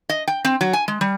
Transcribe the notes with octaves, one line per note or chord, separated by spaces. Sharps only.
D#5
G5
C4
F#3
G#5
G#3
G3